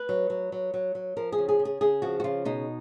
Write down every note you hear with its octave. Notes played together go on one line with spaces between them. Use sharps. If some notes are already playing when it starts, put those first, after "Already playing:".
Already playing: B4
F#3
F#3
F#3
F#3
F#3
F3 A#4
G#4
C#3
G#4
C#3
G#4
C#3 G#4
F3 F#4
F#4
C#3 F4
B2 D#4